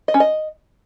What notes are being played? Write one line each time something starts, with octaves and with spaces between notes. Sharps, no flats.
D#5
C#4
D#5